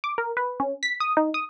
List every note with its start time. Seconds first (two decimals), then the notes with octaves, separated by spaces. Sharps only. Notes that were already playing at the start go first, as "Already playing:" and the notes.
0.04 D6
0.18 A#4
0.37 B4
0.60 C#4
0.83 B6
1.00 D#6
1.17 D#4
1.34 D#6